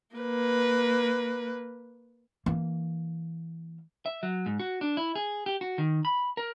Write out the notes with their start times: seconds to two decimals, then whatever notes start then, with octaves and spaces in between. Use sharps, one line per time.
0.16 A#3 B4
2.46 E3 A#3
4.06 E5
4.23 F#3
4.46 G#2
4.59 F#4
4.81 D4
4.97 E4
5.15 G#4
5.46 G4
5.61 F#4
5.78 D#3
6.05 B5
6.37 A#4